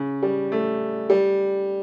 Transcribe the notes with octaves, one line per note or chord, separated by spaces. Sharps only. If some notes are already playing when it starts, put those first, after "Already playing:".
Already playing: C#3
G3
A3
G3